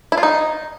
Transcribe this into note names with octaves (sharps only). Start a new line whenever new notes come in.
E4
F4
D#4